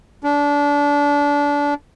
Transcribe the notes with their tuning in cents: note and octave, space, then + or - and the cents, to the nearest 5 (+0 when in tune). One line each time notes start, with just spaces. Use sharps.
D4 -25